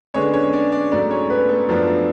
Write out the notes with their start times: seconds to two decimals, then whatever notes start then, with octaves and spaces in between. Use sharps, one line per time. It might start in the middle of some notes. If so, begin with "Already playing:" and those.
0.14 D3 G#3 B3 C#4 D4 C#5
0.33 C#4 C#5
0.53 D4 D5
0.72 D4 D5
0.91 G#2 F#3 A3 D4 D5
1.10 C#4 C#5
1.30 B3 B4
1.49 A3 A4
1.69 F#2 F3 B3 D4